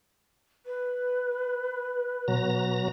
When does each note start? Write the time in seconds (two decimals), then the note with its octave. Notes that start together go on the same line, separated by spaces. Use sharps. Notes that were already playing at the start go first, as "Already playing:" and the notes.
0.66 B4
2.28 B2 F#3 A#5